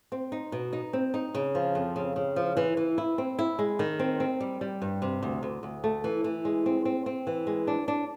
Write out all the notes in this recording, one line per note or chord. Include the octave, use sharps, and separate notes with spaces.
C4
D#4
B2
D#4
C4
D#4
C#3
F3
F2
C#3
C#3
F3
E3
E3
E4
C4
E4
G#3
D#3
C4
C4
G3
G3
G2
C3
D2
D2
D2
A3
E3
E3
G#3
C4
C4
C4
E3
G#3
D4
D4